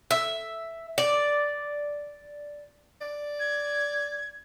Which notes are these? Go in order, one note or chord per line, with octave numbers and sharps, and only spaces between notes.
E5
D5
D5
G#6